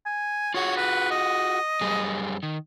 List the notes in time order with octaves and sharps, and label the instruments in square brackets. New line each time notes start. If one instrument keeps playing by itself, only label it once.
[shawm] G#5
[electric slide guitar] F4 F#4 G#4 [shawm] C#5
[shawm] B4
D#5
[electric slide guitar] F#2 G3 G#4
D#3